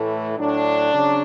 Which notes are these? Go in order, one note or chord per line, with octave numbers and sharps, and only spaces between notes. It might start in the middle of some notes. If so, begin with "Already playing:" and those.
Already playing: A2 E3 A3
A2 F#3 D4
C#3 F#3